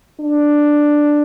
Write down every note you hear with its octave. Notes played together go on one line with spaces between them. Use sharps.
D4